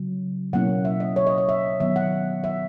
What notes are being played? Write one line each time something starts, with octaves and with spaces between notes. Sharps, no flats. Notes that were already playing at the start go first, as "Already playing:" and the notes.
Already playing: C#3 F#3
B2 F#3 A#3 C#4 E4 F#5
E5
D#5
C#5
D#5
D#5
E5
D#3 F#3 B3 E5
F#5
E5